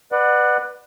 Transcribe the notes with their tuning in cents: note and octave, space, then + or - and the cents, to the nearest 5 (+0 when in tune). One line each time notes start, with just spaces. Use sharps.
B4 +0 D5 +30 F#5 +0